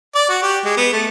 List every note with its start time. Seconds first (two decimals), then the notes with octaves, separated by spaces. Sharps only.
0.15 D5
0.29 F#4
0.42 G4
0.65 G#3
0.77 B3
0.93 A3